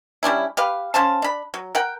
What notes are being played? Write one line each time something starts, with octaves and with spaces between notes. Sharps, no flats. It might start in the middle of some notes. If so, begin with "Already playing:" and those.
G3 C#4 D4 E4
G4 B4 F5
C#4 C5 F5 A5
D4 B5
F#3
A#4 F#5 G5